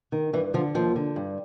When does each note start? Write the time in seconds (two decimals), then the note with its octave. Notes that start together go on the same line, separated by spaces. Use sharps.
0.12 D#3
0.33 G2 E3
0.54 D3 F3
0.75 D#2 F3
0.96 D3
1.16 G2